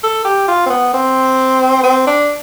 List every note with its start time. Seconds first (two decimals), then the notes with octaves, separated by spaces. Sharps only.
0.03 A4
0.25 G4
0.48 F4
0.66 C4
0.70 B3
0.93 C4
1.83 C4
2.07 D4